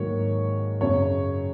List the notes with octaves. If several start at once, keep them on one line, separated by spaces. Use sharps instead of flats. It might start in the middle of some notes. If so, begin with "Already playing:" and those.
Already playing: G#2 D#3 F#3 A#3 C#5
F#2 C#3 F#3 C#5